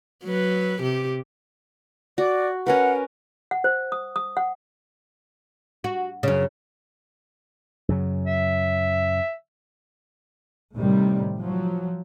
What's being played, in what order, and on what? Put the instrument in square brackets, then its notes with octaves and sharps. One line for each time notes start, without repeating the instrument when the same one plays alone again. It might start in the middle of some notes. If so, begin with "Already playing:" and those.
[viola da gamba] F#3 B4
C3 G4
[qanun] F#4 [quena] D5
[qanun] C#4 A#4 B4 [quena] F#5
[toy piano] F#5
C5
D#6
D#6
F#5
[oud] F#4
F#2 C#3
[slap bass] F#2 C#3 F#3
[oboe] E5
[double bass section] A2 C3 D#3 G3
F3 F#3